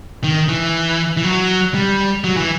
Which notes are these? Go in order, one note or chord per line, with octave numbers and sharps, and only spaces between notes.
D#3
E3
E3
F#3
G3
F#3
E3